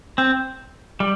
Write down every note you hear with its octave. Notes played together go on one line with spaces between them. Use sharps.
C4
G3